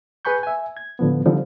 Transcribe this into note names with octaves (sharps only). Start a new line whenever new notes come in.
G#4 B4 G#5 B5 C#6 G6
E5 G#5
G#6
A2 D3 F3 B3
D3 F3 G3 C4 D#4